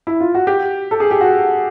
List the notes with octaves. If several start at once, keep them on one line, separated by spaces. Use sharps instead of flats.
E4
F4
F#4
G4
A4
G#4
G4
F#4